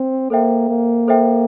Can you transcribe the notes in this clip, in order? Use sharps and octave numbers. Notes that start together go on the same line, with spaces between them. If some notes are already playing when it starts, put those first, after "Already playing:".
Already playing: C4
A#3 A4 C5 E5 G5
A#3
A4 C5 E5 G5